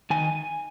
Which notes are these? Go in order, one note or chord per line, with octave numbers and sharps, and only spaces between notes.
D#3 G#5